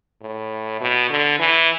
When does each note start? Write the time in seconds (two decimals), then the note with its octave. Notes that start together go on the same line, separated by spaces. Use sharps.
0.22 A2
0.81 B2
1.10 D3
1.39 E3